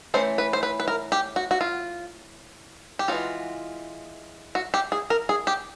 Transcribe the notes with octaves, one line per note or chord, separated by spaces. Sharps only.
E3 A3 C#4 C5
B4
C5
B4
B4
A#4
G4
F#4
F#4
F4
G4
E3 G#3 C#4 F4 F#4
F#4
G4
G#4
A#4
G#4
G4